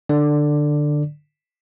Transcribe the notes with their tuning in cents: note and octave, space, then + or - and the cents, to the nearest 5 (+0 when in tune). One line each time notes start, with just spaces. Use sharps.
D3 +15 D5 +0